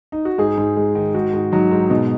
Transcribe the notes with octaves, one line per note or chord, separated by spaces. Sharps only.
D#4
F#4
G#2 D#4 G#4
G#2
G#3
D#3
G#2 F#4
G#2
F#3 D#4
G#2
B2 D#4